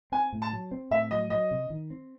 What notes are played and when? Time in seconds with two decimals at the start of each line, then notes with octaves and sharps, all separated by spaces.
0.12 C4 G#5
0.33 A2
0.42 A5
0.53 F#3
0.71 C4
0.91 A2 E5
1.11 F#3 D#5
1.30 F#3 D#5
1.51 C3
1.70 D#3
1.90 C4